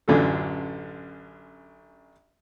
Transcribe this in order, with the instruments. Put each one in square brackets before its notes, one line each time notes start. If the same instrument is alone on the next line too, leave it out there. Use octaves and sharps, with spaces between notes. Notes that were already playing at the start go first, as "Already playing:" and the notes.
[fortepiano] A1 F#2 D3 D4 F4 A4